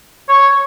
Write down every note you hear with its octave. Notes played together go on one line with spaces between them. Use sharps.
C#5